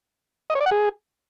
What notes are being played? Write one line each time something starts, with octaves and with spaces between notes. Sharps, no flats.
D#5
C#5
D5
F#5
G#4